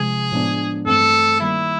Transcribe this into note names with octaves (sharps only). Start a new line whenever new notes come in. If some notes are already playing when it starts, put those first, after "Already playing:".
Already playing: C3 F3 G#3 G#4
A2 F3 G#3 B3 D4
G2 E3 A3 C4 A4
D#3 G3 A#3 E4